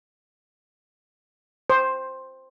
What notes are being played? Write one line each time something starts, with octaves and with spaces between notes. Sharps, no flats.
C5